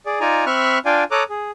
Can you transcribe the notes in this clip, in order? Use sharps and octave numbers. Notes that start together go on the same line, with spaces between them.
G#4 D5
D#4 F4 D5 G#5 A#5
C4 E5 B5 C#6 F6 F#6
D4 F4 D5 F5 G5 G#5
A4 C#5 A#5 D6 D#6 F#6
G#4